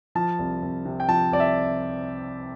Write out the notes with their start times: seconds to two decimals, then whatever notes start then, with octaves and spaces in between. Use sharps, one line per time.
0.15 F3 A5
0.39 C2
0.62 C2
0.85 C3
1.00 G5
1.08 F3 A5
1.32 C2 D5
1.40 E5